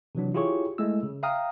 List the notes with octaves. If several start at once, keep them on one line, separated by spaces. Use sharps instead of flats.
C3 E3 F#3 D4
E4 F4 G4 G#4 C#5 C#6
G#3 A3 E4 E6
C#3
E5 F5 G5 A#5 D#6 F6